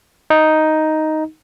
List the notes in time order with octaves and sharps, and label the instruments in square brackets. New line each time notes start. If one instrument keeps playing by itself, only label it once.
[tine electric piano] D#4